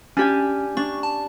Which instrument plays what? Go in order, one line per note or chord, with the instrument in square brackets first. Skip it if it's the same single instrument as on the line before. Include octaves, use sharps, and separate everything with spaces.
[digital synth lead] C#4 [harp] D4 G4 G#5
[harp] D4 [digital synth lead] C#6
[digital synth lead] A5